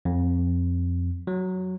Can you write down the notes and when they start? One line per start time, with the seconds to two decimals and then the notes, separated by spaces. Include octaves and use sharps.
0.05 F2
1.27 F#3